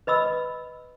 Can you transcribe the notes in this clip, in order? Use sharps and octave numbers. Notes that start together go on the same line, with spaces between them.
B4 D#5 B5 E6